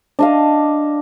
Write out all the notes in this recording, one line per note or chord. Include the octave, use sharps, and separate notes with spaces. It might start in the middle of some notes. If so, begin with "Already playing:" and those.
D4 D#5 F5